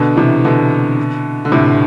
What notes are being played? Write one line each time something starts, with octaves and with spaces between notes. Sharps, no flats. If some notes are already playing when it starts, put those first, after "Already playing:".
Already playing: B2 D3
C3 E3
B2 D3
D3
A2 C3